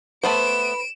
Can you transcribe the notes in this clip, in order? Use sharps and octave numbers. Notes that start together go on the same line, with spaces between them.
A3 B3 B4 C5 B5 D7 E7